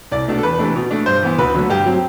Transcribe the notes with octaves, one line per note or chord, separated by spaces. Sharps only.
C2 D5
B2 A3 D4
A4
E2 B4
C3 E3 A3 D4
B2
A3 D4
G2 C5
E3 B3
D2 B4
D3 F#3 A3
G2 G4
F#3 C4